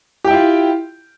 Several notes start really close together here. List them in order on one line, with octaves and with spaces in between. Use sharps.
G4 G5 E4 F4